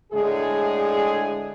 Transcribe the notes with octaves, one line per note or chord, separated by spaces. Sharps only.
A2 D3 G#3 G#4